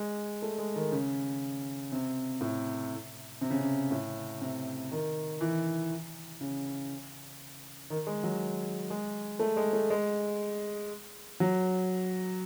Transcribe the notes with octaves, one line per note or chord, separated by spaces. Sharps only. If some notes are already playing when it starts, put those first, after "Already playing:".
Already playing: G#3
A3
G#3
D#3
C#3
C3
A2
C3
C#3
C3
A2
C3
D#3
E3
C#3
D#3
G#3
F#3
G#3
A3
G#3
A3
G#3
F#3